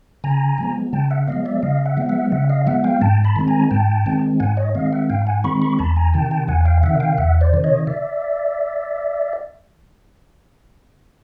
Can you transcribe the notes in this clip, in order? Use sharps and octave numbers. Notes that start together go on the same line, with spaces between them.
C#3 G#5 A#5
F3 G#3 B3
C#3 G5 A5
E5 F#5
F3 G#3 B3 D#5 F5
D5 E5
C#3 D#5 F5
E5 F#5
F3 G#3 B3
E5 F#5
C#3 E5 F#5
D#5 F5
F3 G#3 B3 E5 F#5
F5 G5
G#2 G5 A5
A5 B5
D#3 G#3 C4
G#5 A#5
G#2 G5 A5
D#3 G#3 C4
G#2 F#5 G#5
C#5 D#5
D#3 G#3 C4 D#5 F5
E5 F#5
G#2 F5 G5
F#5 G#5
D#3 G#3 C4 B5 C#6
B5 C#6
E2 A5 B5
G#5 A#5
C3 D#3 G5 A5
G5 A5
E2 F#5 G#5
F5 G5
C3 D#3 E5 F#5
F5 G5
E2 E5 F#5
C5 D5
C3 D#3
C#5 D#5
D5 E5